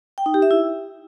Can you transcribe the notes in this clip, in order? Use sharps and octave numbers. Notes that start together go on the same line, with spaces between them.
G5
D#4
G4
E5
E4